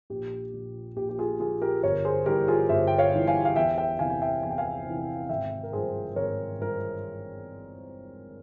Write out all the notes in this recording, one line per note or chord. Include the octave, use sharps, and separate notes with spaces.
A#1 G4
A#2 F3
A#1 G4
G4
F4 G#4
A#2 F3 F4 G#4
G4 A#4
G1 A#4 C#5
G#4 C5
G2 E3 G4 A#4
F4 G#4
G1 C5 E5
G5
C#5 F5
G2 E3
F5 G#5
F5
E2 E5 G5
E5 G5
C3 E3 F5 G#5
G#5
E5 G5
E2 G#5
G5
F5 G#5
C3 E3
G#1 E5 G5
A#4
G2 F3 G#4 C5
G#1 A#4 C#5
G2 F3 A#4